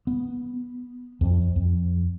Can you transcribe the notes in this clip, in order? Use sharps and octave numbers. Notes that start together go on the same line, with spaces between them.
B3
F2
F2